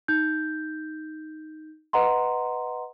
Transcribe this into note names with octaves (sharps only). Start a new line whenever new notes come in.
D#4 G6
B4 D#5 F#5 A#5 C6